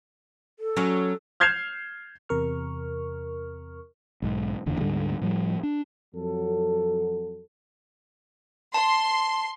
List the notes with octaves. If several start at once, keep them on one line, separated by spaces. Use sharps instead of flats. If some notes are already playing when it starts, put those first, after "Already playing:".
A4
F#3 C#4
F6 G6 G#6 C7 E7 F7
E2 C3 A#4 C#6 F6
B1 G#2
F#1 E2 D3
D2 G#2 D3 G3
A2 F3 G3
D4
F2 F#3 A4
A5 C6